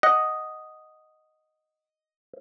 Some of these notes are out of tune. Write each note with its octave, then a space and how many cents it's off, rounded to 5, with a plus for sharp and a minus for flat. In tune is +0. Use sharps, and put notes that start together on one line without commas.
D#5 +0 F#5 +0